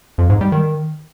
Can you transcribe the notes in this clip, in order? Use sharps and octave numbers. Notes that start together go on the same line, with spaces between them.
F2
G#2
G3
D#3